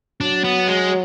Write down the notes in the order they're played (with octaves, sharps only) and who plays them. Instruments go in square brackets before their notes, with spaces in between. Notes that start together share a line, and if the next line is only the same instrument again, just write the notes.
[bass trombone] F#3 [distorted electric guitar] D4
[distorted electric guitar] B3
G#3